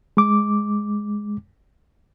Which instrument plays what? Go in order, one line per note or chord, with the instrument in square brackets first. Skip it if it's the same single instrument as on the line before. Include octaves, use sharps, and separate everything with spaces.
[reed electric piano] G#3 D6